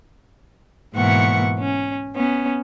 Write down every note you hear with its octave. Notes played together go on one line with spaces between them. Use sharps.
G#2 B2 E3 A#3 F#5 C#6
C#4
B3 C#4